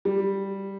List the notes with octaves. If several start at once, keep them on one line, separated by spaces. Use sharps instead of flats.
G3